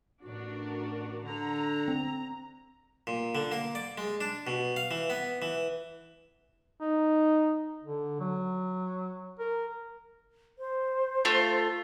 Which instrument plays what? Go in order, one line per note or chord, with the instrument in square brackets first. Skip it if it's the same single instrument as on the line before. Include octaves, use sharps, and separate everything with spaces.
[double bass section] A1 [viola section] D4 F#4 A#4
[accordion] D3 [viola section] A#5
[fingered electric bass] C4
[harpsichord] A#2
D3
A#3
D5
G#3
D4
B2
F5
E3
B3
E3
[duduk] D#4
D3
F#3
A#4
[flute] C5
[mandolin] A3 F4